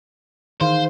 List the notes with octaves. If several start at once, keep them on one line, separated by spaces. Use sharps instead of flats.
D#3 E3 G#4 C5 F5